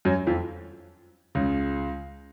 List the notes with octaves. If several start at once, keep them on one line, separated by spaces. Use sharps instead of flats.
F#2 F#3
F2 F3
C#2 C#3